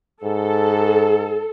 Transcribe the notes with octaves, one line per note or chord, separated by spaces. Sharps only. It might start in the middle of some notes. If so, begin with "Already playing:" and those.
G#2 A4